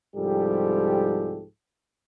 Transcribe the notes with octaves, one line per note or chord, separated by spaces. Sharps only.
C2 G#2 F3 G3 G4 A4